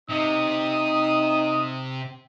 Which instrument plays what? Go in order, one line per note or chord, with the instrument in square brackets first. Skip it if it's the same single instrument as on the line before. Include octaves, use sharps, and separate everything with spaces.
[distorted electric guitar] C3 [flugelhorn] D#4 [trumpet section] D#6